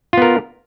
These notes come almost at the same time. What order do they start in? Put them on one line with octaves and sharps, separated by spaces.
F4 B3 A#4